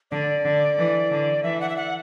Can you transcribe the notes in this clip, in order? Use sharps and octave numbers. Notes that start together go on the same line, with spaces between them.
D3 D5
D3
E3
D3
E3 E5
F#5
E5
F#5